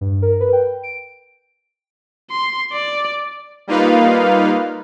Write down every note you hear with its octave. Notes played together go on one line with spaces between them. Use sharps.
G2
A#4
B4
G5
D7
C6
D5
G3 A#3 D#4 F4 B4 F5